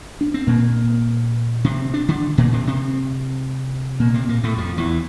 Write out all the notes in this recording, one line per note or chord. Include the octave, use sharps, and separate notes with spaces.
D4
C4
A#2 A#3
C3 C4
D4
D3 D4
A#2 A#3
C3 C4
C3 C4
A#2 A#3
C3 C4
A#2 A#3
A2 A3
F2 F3
E2 E3